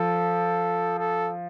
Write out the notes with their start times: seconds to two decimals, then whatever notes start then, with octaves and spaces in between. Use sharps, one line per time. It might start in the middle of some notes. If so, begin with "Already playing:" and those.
Already playing: F3 A4
0.99 A4